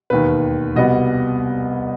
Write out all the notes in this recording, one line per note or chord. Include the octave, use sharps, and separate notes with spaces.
E1 D#2 D#3 B4
C2 B2 G3 B3 D#5